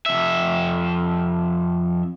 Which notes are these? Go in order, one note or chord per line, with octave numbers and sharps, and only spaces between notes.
F2 E5